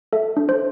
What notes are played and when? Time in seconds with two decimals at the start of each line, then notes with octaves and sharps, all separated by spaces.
0.13 A4 E5
0.37 D4
0.49 C5